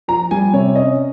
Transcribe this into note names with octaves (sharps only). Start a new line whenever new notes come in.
F3 A#5
G3 G#5
C3 C#5
C#4 D#5